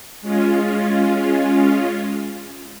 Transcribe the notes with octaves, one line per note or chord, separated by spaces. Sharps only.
G#3 C#4 F4